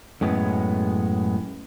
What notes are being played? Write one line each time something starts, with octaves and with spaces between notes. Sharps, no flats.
F#2 A2 G#3 B3 C#4